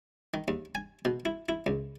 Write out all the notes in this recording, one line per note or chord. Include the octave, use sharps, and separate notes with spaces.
D#3
D#2
G#5
B2
E4
E4
C#2